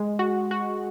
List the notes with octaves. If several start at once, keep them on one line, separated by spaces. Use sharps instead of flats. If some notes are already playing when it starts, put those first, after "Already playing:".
Already playing: G#3
F#4
F#4